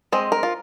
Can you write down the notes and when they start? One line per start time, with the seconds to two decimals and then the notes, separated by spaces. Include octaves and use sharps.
0.12 G#3 C4 D#5
0.32 A#4
0.43 F4